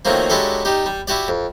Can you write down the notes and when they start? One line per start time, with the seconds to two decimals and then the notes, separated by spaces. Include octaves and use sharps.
0.05 D#3 F3 F#3 A3 A#3 C4
0.30 F#3 G#3 D4 E4 G4 A4
0.65 G3 D#4 G4
0.86 G3
1.07 E4 F#4 G4 D5
1.28 F2